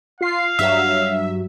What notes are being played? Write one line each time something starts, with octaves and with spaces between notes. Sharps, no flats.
F4 F5 C7
G2 F#3 E5